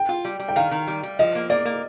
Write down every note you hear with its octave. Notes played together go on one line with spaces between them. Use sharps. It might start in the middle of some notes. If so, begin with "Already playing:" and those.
Already playing: G5
F4
G3
G3
G5
D#3 F5
D#3
G3
G3
F3 D#5
A#3
A#3 D5
A#3